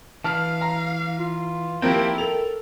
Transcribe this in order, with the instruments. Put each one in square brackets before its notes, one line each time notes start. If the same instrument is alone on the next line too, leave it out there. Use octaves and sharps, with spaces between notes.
[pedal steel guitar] E3 [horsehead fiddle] F5 [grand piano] A5 F6
[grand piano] A#5
[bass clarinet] F4
[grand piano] F3 A#3 C4 [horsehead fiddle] E4 G4 [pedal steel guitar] G5
[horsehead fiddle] A4 [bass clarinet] A#4 [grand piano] F7